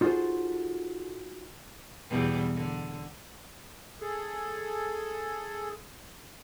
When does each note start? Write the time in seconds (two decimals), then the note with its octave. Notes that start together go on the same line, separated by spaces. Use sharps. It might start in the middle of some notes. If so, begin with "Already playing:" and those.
0.01 D#4 F4 F#4 G#4 A4 C5
2.10 E2 B2 G3
2.54 D3
4.01 G#4 A4